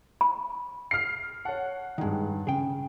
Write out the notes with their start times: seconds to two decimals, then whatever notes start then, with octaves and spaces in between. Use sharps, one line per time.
0.21 B5
0.91 F6 C7
1.45 C#5 F#5 A5
1.98 G2 D#3 G#3 D#4
2.47 C#3 G#4 G5